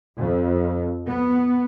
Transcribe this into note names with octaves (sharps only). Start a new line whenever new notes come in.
F2
B3